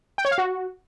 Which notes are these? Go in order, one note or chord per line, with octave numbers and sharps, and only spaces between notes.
G5
C#5
F5
F#4